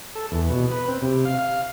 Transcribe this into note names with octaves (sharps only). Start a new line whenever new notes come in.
A4
E2
B2
B4
C4
C3
F5
F5